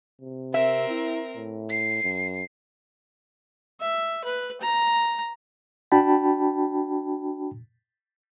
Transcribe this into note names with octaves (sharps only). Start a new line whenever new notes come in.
C3
C4 A#4 E5
E4
A2
C7
F#2
E5
B4
A#5
D4 F#4 G5 A5 B5